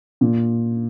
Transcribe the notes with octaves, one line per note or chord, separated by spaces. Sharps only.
A#2